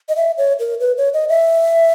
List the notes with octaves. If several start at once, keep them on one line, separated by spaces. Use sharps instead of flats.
D#5
E5
C#5
A#4
B4
C#5
D#5
E5